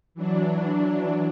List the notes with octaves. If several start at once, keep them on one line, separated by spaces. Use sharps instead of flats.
E3 F#3 D4